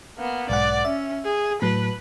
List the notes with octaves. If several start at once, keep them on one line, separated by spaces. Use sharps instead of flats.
A#3 B3
B1 G#2 D5 F#5
C#4 E5
G#4
A2 F#3 B4